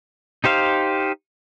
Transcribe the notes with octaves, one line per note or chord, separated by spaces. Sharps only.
D#4 G4 C5 F5